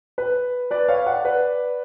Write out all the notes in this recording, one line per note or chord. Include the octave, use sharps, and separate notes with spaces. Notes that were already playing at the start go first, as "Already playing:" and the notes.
B4
B4 D5
C#5 F5
D5 F#5
B4 D5